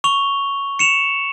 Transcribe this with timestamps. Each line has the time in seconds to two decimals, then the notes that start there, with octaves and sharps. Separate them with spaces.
0.04 C#6 F7 G7
0.79 C#7 E7 F7